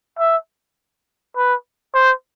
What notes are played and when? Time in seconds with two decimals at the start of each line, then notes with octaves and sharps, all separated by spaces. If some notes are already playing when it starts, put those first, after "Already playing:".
0.19 E5
1.37 B4
1.95 C5